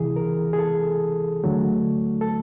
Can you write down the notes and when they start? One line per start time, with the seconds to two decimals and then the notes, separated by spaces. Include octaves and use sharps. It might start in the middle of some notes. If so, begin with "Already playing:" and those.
Already playing: C#2 C3 E3 G#4
0.16 A#4
0.53 G#4
0.59 A4
1.44 D2 D3 F#3 A3
2.21 A4